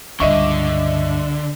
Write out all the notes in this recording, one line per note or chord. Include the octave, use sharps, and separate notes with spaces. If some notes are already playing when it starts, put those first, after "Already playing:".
C#2 G2 D3 D#5 E5 C#6